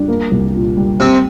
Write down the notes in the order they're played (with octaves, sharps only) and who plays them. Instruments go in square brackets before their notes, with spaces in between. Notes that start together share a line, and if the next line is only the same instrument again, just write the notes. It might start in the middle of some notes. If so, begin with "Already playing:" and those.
Already playing: [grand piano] G3 D4
A#3
C2
A#2
G3
[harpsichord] C3 C4 [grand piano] G4